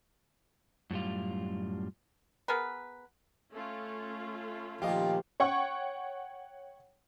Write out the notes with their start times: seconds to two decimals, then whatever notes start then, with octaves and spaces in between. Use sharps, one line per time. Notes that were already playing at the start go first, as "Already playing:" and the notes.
0.91 F#2 A2 G3 F4
2.48 B3 G#4 A#4 B4
3.51 A3 C#4 F4
4.82 A#2 D#3 F3 G4 D#5 F5
5.40 C#5 F#5 G5 C#6